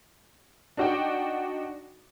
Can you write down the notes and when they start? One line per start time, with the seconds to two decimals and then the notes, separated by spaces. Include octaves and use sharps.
0.77 D4 D#4 F#4 D5 G5